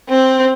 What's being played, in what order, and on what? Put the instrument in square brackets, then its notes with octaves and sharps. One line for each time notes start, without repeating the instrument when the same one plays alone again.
[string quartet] C4